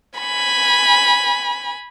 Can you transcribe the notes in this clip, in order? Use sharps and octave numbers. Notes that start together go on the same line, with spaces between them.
G#5 B5